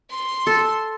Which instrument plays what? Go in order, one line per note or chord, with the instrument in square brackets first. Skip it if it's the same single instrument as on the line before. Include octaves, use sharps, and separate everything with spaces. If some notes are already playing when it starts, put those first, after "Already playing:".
[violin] C6
[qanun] A4